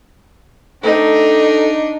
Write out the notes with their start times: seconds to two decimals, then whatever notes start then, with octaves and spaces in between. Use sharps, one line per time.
0.83 A3 C4 D4 D#4 A4